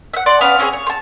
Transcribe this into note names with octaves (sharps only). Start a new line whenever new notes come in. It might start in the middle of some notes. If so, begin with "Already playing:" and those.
E5 F#5
D5 F#5 C6 D6
B3 C#4 F5 B5
C4 C#4 F#4 G#4
C#5
A5 C6